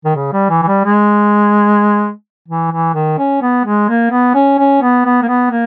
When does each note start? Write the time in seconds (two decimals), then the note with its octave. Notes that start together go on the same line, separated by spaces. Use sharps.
0.05 D#3
0.15 C#3
0.33 G3
0.50 E3
0.62 E3
0.67 G3
0.85 G#3
2.48 E3
2.71 E3
2.94 D#3
3.18 C#4
3.42 B3
3.65 G#3
3.88 A#3
4.11 B3
4.34 C#4
4.58 C#4
4.82 B3
5.05 B3
5.22 A#3
5.28 B3
5.51 A#3